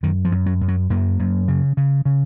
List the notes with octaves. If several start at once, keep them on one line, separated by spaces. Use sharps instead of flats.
F#2 D#3
F3
F#2
F#3
F#2
F#3
F#2 A#3
F#2
C#3
C#3
C#3